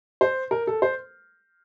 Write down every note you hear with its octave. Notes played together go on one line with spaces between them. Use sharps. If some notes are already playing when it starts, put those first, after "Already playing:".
C5
A#4
A4
C5